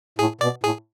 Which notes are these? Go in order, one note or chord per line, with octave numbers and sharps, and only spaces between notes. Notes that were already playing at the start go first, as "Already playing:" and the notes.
A2 G#4
B2 D5
A2 G#4